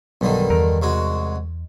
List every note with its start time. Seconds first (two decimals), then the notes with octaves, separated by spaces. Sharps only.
0.21 B1 G2 D3 D#3
0.50 E2 A#4
0.82 C2 G#3 F#4